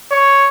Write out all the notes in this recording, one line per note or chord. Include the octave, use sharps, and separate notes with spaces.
C#5